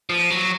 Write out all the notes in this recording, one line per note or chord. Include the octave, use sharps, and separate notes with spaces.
F3
F#3